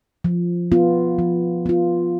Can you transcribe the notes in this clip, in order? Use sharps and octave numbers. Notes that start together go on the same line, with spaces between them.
F3
B3 F4
F3
B3 F4